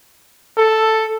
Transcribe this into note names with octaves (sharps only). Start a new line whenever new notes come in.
A4